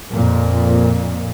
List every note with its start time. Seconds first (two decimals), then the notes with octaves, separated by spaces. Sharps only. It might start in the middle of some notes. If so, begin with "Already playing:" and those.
0.13 F2 A#2